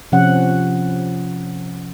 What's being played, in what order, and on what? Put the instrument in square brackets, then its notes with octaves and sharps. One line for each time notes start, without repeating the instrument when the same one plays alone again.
[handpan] C3 F3 C#4 F#5